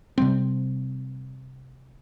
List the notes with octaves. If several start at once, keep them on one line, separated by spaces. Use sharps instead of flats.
C3 G3 C4